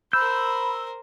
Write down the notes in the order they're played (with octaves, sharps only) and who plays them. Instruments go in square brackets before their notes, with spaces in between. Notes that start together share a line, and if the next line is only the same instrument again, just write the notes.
[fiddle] A#4 C5 [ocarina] B5 [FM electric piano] E6 [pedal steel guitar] G6